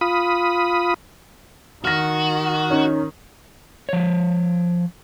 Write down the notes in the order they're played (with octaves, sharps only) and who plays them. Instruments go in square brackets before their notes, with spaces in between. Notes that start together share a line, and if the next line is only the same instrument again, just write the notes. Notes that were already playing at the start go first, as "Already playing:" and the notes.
[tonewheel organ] F4 B5 D#6
[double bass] D#3 [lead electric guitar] F#4 [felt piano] F6 A#6
[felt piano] C#4 D#4
[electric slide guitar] F3 C#5